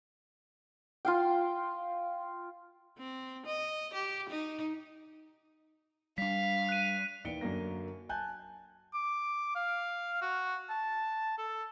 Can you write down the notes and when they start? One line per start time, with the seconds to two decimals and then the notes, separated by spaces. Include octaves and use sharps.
1.05 F4 F5 G5
2.98 C4
3.46 D#5
3.94 G4
4.29 D#4
6.18 G3 D4 F5 B6
6.69 F#6 D#7
7.24 D#2 E3 D5 C#7 D7 G7
7.41 F#2 D3 F#3 A#3 A#6
8.09 G#5 A5 F#6 G6
8.93 D6
9.55 F5
10.22 F#4
10.70 A5
11.38 A4